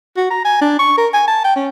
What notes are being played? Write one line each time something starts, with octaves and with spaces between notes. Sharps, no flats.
F#4
A#5
G#5
D4
C#6
A#4
G#5
A5
G5
C#4